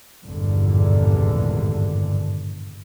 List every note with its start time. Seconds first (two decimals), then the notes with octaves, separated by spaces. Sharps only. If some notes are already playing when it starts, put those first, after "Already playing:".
0.24 G#1 E2 G2 A#2 D3